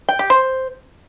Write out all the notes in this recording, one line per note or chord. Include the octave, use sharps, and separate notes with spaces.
G5
G4
C5